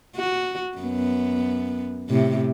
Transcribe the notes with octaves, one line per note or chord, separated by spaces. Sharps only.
F#4
F#2 B3
A2 C3